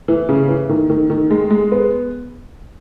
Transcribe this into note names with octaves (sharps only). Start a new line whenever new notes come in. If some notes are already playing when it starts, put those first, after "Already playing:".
E3
C#3
E3
D#3
D#3
D#3
G#3
G#3
B3